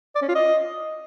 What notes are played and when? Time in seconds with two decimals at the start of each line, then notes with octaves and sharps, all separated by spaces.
0.16 D5
0.22 C#4
0.29 F4
0.35 D#5